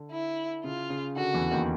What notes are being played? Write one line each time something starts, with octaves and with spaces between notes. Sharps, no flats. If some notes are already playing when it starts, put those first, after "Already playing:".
Already playing: D3
E4
C#3 F4
C#3
D3 F#4
E2 E3
D#2 D#3